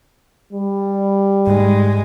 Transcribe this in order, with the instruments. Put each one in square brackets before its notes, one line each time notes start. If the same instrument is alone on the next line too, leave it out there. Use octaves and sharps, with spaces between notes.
[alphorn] G3
[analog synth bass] G#2 [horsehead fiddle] G#3